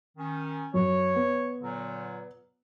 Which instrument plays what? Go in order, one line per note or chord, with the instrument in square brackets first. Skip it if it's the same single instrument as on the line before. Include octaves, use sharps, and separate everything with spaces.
[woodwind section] D#3 C#4
[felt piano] F#2 [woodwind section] C#5
[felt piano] B3
[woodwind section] A#2 D3 F#3